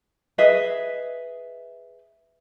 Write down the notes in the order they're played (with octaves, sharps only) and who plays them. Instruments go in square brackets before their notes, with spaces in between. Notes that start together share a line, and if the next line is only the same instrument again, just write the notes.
[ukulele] G#4 B4 D#5 E5